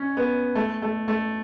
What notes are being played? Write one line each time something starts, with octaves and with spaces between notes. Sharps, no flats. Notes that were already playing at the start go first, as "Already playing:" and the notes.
Already playing: C#4
B3
A3
A3
A3